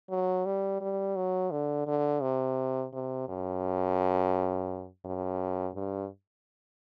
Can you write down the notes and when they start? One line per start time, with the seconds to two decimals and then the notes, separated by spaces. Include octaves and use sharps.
0.11 F#3
0.46 G3
0.81 G3
1.16 F#3
1.51 D3
1.87 D3
2.22 C3
2.93 C3
3.29 F#2
5.05 F#2
5.75 G2